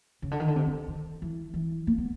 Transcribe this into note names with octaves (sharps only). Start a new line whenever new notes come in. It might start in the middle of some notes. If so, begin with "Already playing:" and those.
C#3
D3
D#3
D3
C3
C3
D#3
E3
E3
A#3
B3